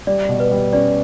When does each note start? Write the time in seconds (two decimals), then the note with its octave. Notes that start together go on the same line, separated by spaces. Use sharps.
0.07 G3 D5
0.29 B2
0.40 B4
0.51 G3
0.73 C#4 D5